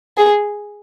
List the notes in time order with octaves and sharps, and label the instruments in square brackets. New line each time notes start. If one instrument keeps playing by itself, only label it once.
[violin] G#4